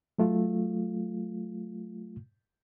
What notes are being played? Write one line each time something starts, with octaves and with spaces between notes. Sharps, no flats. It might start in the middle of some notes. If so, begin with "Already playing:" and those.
F#3 A3 F4